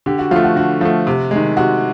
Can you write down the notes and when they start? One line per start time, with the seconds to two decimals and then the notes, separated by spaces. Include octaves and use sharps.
0.06 D3 G4
0.19 F#4
0.31 F3 F4
0.36 A3
0.44 F#4
0.56 D3 F#4
0.81 F3 A3
1.07 C3
1.31 D#3 G#3
1.57 C3 F#4